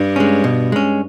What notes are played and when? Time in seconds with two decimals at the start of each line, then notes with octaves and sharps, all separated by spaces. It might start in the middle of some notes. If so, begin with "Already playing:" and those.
Already playing: G2
0.16 G#3 C#4
0.44 B2
0.72 G#3 C#4